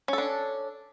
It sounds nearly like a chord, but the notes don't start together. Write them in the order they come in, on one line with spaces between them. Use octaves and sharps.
C#4 A4 D4